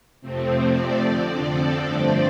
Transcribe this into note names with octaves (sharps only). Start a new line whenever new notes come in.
F2 C3 F3 A3 C4
D5
F2 D3 F3 C4
A4
G2 D3 F3 A3 C4 D5